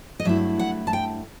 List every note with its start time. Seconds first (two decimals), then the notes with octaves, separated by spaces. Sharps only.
0.20 D#5
0.25 G2 F#3 A3 E4 E5
0.59 F#5
0.87 A5
0.93 G5